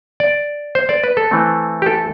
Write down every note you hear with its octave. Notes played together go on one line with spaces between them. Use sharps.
D5
C5
D5
B4
A4
E3 A3 C4
G4
A4